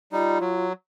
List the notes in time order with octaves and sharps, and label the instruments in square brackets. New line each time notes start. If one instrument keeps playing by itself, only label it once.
[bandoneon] G3 D#4 [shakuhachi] F4
[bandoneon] F#3